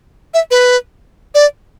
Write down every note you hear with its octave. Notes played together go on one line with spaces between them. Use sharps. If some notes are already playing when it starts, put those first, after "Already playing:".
E5
B4
D5